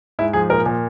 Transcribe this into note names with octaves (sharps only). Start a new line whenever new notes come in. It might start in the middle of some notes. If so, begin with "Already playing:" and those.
G#2 E4
F3 G#4
A#2 A#4
A#2